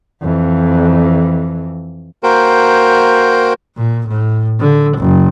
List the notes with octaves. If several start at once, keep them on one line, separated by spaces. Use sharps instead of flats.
F2 E3
A#3 F#4 A#4 C5 G5
A#2
A2
D3
F#1